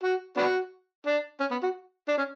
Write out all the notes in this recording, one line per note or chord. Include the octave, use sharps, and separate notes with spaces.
F#4
B3 D4 F#4
D4
C#4
B3
F#4
D4
C#4